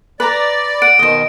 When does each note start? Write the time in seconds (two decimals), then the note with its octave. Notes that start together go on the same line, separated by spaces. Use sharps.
0.20 B4 D5 A#5
0.82 F#5 D7
0.99 B2 D#3 C5 D#5